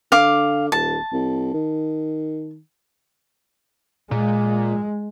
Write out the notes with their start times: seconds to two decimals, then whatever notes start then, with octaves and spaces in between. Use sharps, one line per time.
0.12 D3 F5 D6
0.72 D#1 A5
1.12 C2
1.54 D#3
4.11 A#2 G#3